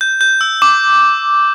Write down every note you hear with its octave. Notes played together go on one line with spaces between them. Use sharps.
G6
G6
E6
D6